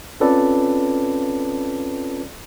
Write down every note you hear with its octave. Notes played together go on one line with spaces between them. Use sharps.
C4 C#4 F4 A4 B4 D5